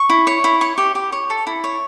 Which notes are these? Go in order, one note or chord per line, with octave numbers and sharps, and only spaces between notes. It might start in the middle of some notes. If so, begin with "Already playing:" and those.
Already playing: C#6
E4
C#5
E4
C#5 C#6
G4
G4
C#5
A4
E4
C#5